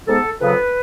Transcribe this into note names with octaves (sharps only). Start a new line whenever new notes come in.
G#2 G#3 B3 A4
F2 C#3 F#3 B3 B4